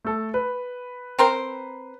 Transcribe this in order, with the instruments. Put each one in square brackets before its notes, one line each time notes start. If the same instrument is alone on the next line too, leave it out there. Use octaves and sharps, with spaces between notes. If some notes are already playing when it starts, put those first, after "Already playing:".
[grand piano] A3 A4
B4
[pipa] C4 A#4 C5